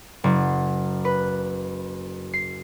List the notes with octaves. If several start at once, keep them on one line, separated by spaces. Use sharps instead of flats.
F#1
B4
C7